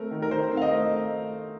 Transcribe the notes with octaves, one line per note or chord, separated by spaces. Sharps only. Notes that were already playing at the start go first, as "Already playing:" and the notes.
Already playing: A3 C4 A#4
D#3
A#4
D#3 C5
C4
F5
D#5
A3